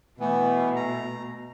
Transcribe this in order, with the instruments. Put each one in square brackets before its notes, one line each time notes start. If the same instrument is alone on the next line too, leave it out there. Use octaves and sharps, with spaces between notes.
[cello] B2 [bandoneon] E3 B3 [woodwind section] A3
[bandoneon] A#5